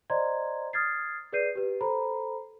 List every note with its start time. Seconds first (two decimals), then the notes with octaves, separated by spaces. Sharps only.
0.10 C5 D5 D#5 A#5 C6 G#6
0.73 D#6 F6 G#6 A6 C7
1.33 G#4 B4 D5 G6 C7 D#7
1.55 G4 B4
1.81 A4 C5 A#5 B5